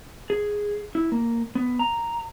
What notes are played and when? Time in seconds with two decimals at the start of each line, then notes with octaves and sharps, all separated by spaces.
0.30 G#4
0.95 E4
1.12 A#3
1.55 B3
1.79 A#5